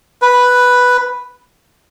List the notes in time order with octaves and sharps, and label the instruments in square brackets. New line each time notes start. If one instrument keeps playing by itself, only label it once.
[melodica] B4